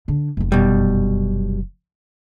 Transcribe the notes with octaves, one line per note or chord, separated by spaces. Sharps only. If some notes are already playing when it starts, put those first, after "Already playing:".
D3 D4
F1 F#2
B2 G3